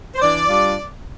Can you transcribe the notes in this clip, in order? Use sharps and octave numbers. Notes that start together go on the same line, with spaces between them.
C5
E3 D4 D5
G3 D4 F4